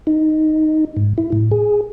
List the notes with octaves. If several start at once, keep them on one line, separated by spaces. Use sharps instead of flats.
D#4
G#2
E4
A2
G#4